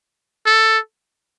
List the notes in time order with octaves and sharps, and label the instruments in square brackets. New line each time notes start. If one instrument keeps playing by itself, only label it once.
[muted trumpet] A4